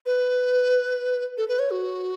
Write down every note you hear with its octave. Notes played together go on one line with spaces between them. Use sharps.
B4
A4
B4
C#5
F#4